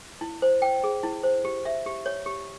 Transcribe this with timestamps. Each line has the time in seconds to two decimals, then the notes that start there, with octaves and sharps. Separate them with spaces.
0.21 E4
0.42 C5
0.62 G5
0.84 G#4
1.03 E4
1.23 C5
1.45 G4
1.65 E5
1.86 G4
2.06 C#5
2.26 G4